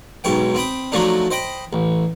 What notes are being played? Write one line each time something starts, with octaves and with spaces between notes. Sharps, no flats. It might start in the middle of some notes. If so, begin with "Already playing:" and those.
B1 G#2 C#5 G5
C4 G5 B5 D#6
F3 F#3 A3 D4 D#4
C5 D#5 G5 B5
A1